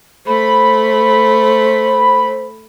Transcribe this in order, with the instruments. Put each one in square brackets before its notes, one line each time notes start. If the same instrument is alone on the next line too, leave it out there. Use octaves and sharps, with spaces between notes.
[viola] A3 [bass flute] C5 [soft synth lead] B5